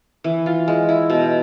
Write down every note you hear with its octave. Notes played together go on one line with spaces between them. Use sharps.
E3
F4
G#3
E4
B2